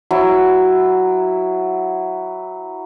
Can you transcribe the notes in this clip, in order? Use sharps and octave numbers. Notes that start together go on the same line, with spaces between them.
F#3 E4